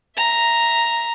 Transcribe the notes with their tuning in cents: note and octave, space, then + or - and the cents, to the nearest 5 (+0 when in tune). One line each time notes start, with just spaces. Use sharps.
E5 +0 A#5 +0